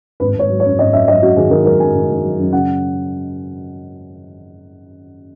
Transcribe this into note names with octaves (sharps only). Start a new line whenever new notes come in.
G#1 B4
G#1 C#5
F#3
C#5
F#2
G#1 D#5
F#2 E5
F#2 D#5
F#2 F#4
D#3 G#4
D#3 A#4
F#3 A#4
F#2 G#5
D#3
D#3
F#3
F#2
C#3 F#5